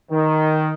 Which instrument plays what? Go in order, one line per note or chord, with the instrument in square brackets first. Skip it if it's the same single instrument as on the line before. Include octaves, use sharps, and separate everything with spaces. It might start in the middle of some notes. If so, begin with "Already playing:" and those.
[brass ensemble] D#3